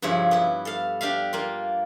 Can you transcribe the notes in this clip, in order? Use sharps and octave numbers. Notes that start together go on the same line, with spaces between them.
G2 C#3 F3 E4 C#5
B3 E4
A4 F5
D4 G4 E5 F5
A#3 F4